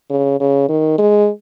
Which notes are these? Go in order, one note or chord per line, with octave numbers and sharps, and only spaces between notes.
C#3
C#3
D#3
G#3